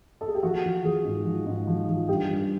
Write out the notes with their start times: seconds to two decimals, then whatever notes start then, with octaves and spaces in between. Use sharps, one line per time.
0.21 A4
0.28 G#4
0.35 G4
0.43 F3 F#4
0.63 F3
0.84 F3 G#4
1.05 G#2
1.25 F3
1.46 G#2
1.67 F3
1.88 F3
2.08 G2 G4
2.29 G2